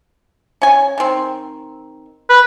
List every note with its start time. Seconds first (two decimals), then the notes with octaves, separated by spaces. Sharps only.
0.62 C#4 G#5
0.98 D#3 C4
2.30 B4